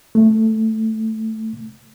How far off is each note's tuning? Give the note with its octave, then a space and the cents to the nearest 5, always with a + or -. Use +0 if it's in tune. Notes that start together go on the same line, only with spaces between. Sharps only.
A3 +5